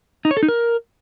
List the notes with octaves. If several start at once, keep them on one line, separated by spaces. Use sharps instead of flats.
D#4
C#5
A4
D#4
A#4